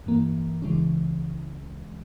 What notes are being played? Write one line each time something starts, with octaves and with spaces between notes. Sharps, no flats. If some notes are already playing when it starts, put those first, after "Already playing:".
G2 E3 A#3
C#2 C#3 E3 G#3 C#4